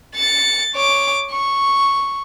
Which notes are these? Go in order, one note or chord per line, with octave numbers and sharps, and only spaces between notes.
A6 C#7
C#5 D6
C#6